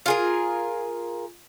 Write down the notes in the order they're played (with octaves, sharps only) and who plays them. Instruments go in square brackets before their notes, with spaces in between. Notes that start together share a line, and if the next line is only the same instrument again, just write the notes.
[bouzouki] F4 G#4 A#4